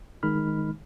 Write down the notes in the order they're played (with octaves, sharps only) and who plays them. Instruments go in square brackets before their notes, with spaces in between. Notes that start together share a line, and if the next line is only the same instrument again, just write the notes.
[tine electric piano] D#3 G#3 D#4 B5 F6